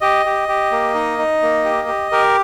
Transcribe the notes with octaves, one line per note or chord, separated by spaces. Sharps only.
G4 D#5
G4
G4
A#3
D#4
D#4
A#3
G4
G4
G4 A#4